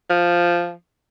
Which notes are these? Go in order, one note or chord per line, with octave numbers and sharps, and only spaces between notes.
F3